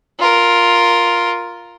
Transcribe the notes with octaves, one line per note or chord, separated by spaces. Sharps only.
F4 A#4